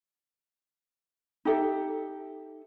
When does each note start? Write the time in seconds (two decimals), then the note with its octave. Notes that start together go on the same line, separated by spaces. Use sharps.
1.45 D#4 G4 A4 E5